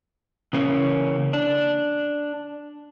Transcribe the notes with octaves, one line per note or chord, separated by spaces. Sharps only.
C#3 E3 A#3 C#4
D4